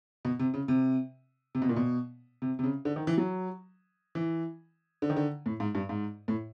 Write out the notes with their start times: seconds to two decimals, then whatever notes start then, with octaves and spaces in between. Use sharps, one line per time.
0.25 B2
0.39 C3
0.54 C#3
0.68 C3
1.55 C3
1.62 B2
1.69 A#2
1.76 B2
2.42 C3
2.59 C3
2.64 C#3
2.85 D3
2.96 D#3
3.07 E3
3.18 F#3
4.15 E3
5.02 D3
5.10 D#3
5.17 D3
5.46 A2
5.60 G#2
5.75 G2
5.89 G#2
6.28 A2